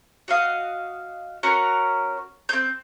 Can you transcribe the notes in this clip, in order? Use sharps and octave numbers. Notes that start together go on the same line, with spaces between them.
F#4 D#5 F5
C#4 F#4 A#4
C4 G6